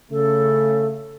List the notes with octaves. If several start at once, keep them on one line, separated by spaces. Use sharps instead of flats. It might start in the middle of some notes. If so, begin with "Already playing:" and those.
C#3 A3 A4